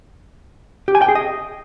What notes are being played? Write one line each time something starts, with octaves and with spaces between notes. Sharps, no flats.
G4
G#5
G5
G#4
D#5